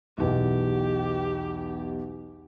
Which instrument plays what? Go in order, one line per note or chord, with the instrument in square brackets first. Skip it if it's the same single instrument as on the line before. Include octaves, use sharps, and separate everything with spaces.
[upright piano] B1 E2 B2 [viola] G4